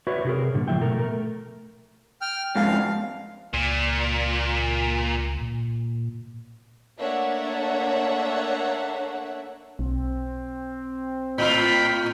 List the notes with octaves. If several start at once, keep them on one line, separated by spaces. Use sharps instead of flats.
F#4 B4 C#5 D5 E5
C3 E4 G4 G#4 A#4
G2 A#2 D3
A2 F3 A3 E4 E5 G5
B2 A3 A#4
A3 A#4
G5 F6
F2 G#2 F5
C#2 A#2
A#2
A3 A#3 D4 C#5 E5 F#5
B1 C4
A2 F4 G5 B5